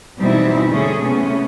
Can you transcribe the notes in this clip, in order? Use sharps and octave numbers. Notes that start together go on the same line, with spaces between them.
B2 E3 G3 C4 D#4 E4
D3 G3 A3 C#4 G#4
C3 A3 B3 C#4